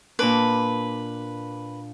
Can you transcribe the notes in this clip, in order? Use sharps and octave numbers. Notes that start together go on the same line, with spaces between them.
A#2 D4 B4 D6